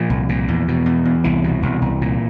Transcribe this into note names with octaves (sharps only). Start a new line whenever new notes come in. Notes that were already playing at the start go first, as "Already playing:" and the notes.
Already playing: A#2 F3
C2
A#2
E2
B2
E2
E2
C2 E3
B2
C2
C2
A#2